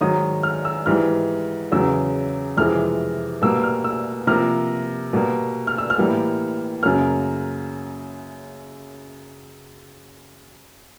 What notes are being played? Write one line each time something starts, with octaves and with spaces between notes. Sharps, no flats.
G#2 D#3 F#3 D#6
F6
E6
G#2 E3 G3 F6
E2 C#3 F#3 E6
F2 C3 E3 G#3 F6
B2 G3 A#3 E6
F6
E6
C3 F3 A#3 F6
B2 G3 A#3
F6
E6
F6
A2 E3 G3 A#3
F#2 C#3 F#3 A#3 F6